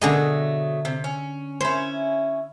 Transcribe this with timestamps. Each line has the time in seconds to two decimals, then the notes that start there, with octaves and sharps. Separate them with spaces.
0.02 B2 D3 F#3 A3 G#4 D#5
0.85 C3
1.04 C#4
1.61 C#4 E4 C5